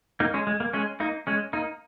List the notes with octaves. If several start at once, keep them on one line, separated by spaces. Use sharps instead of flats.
A#3 D#4
G#3 C#4
G#3
A#3
G#3 C#4
A#3 D#4
G#3 C#4
A#3 D#4